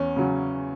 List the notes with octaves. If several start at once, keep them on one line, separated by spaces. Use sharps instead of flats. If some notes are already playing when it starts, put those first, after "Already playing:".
Already playing: E2 C#4
C#3 F#3